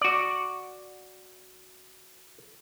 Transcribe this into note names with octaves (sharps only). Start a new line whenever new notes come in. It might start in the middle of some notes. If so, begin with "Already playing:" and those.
F#4 D5